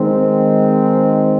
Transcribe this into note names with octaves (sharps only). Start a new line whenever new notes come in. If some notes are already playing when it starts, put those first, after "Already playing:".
Already playing: D#3 G#3 C4